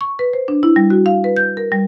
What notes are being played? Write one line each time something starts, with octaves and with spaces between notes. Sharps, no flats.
C#6
B4
C5
D4
E4
G3
F#4
F5
B4
G6
A#4
G3